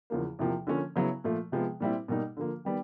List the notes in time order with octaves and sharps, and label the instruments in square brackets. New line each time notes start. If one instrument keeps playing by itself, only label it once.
[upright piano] E2 C#3 F3 A#3
E2 C3 F3 A#3
D3 F3 A#3 C#4
C#3 F#3 B3 E4
A#2 F3 A3
C3 F3 G#3 B3
A#2 G3 C4 E4
B2 G3 A#3 D#4
D3 F3 A#3
D#3 G3 B3